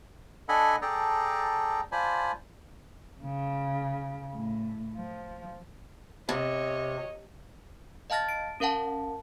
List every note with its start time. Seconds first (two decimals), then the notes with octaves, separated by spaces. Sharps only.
0.49 D4 A4 D#5 F#5 G#5 B5
0.82 G#4 A4 D5 G5 A5 A#5
1.92 F4 C5 D5 G#5 A5 B5
3.22 C#3
4.35 A2
4.96 F3
6.29 C3 C#5 D#5
8.10 D#5 F5 A5 F6 A6 A#6
8.29 D7
8.60 C#4 A#4 F5 F#5 A5